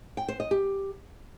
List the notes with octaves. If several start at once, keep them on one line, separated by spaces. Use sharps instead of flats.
G5
C5
D#5
G4